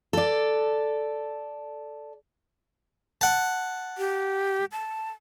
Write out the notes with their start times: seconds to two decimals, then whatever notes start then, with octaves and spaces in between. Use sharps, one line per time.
0.13 A4 D5
3.21 F#5 A5
3.98 G4
4.72 A5